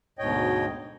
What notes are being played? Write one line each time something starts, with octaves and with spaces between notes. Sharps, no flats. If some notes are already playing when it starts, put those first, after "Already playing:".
D2 G#2 B2 C#5 D#5 G5